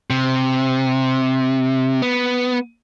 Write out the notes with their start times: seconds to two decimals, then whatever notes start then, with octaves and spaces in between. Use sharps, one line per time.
0.10 C3
2.02 B3